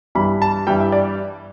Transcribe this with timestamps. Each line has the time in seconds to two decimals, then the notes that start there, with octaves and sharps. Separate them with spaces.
0.15 G2 E3 G3 B5
0.42 A5
0.67 G2 E3 G3 G5
0.80 E5
0.92 D5